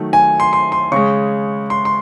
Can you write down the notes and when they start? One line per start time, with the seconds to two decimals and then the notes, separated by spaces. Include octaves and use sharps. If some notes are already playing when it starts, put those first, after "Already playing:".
Already playing: D#3 F#3 A3
0.13 G#5
0.40 C6
0.53 C6
0.72 C6
0.92 C#3 G#3 C#6
1.70 C6
1.85 C6